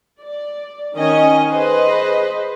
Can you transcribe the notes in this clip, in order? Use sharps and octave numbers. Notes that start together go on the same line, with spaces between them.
D5
D#3 C#4 D#5 G#5
G#4 B4 C5 D#5